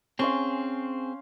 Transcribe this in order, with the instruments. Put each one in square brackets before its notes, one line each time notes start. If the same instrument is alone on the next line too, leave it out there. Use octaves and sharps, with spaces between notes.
[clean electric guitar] C4 G#4 [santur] C#4 C5 F5